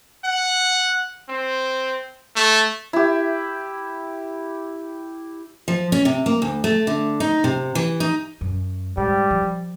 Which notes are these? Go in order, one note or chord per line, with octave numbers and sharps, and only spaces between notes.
F#5
C4
A3
E4 G4
F3
C#4
C3
A#3
D2
A3
D3
D#4
C3
E3
D#4
F#2
G#2 G3
F3